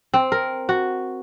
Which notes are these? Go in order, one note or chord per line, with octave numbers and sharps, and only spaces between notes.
C4
A#4
F#4